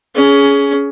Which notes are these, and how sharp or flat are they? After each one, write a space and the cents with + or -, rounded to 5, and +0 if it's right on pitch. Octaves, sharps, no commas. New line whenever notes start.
C#4 +20 G#4 +15